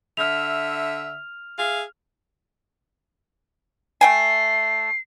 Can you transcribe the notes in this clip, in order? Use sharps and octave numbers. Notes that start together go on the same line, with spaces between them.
D3 E5 F6 F7
G#4 E5 F5
A3 G5 G#5 C7